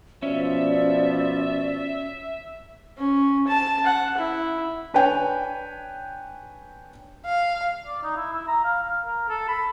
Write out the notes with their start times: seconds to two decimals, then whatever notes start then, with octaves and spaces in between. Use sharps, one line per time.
0.23 B2 F3 C#4 D5 E5
2.98 C#4
3.47 A5
3.86 F#5
4.18 E4
4.94 D4 B4 C#5 G5 G#5
7.26 F5
7.86 D5
8.03 D#4
8.16 E4
8.33 E4
8.48 A#5
8.64 F5
8.83 F5
9.06 A#4
9.29 A4
9.48 B5